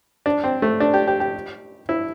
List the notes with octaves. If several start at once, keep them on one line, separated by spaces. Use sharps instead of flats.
D4
C4
A3
D4
G4
G4
G4
E4